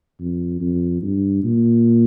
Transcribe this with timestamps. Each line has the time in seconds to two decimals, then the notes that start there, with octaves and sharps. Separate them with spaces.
0.20 F2
0.61 F2
1.02 G2
1.44 A#2